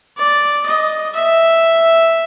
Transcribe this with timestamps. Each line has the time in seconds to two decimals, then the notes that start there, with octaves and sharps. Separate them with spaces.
0.18 D5
0.66 D#5
1.16 E5